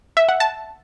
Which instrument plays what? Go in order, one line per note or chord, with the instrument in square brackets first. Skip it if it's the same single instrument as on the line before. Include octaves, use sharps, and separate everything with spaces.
[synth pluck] E5
F#5
A5